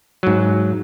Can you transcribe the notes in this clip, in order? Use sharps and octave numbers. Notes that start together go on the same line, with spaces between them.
G#2 F#3